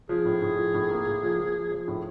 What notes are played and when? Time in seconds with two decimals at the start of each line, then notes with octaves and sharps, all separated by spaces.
0.09 F3 G#4
0.25 A2
0.42 A2
0.57 F3
0.74 A2
0.90 A#3
1.07 A2
1.23 F3
1.39 F3
1.56 F3
1.72 F3
1.88 A2